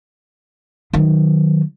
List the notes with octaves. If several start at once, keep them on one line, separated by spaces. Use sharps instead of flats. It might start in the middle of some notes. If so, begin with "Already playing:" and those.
D#3 F#3